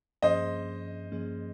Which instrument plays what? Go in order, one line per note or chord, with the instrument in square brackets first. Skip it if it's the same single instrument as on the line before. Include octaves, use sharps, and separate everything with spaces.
[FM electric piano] G2 F3 A#3 C#4 G#4 [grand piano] C5 D#5
[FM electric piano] G2 F3 A#3 C#4 G#4